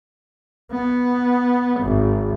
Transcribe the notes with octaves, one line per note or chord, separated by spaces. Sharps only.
B3
G#1